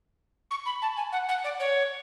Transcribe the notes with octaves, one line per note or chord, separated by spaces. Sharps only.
C#6
B5
A5
G#5
F#5
F#5
D5
C#5